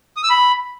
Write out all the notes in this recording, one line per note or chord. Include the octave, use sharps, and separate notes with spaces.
D#6
E6
B5